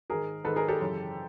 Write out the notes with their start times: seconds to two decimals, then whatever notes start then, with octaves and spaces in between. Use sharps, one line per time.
0.10 G#2 D#3 G#4 A#4
0.44 G#2 D#3 A4 B4
0.56 G#4 A#4
0.68 G4 A4
0.80 F#2 C#3 E3